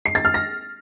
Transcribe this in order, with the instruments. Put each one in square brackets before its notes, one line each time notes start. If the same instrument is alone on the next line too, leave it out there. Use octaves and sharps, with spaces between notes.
[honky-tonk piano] C7
A6
F6
A#6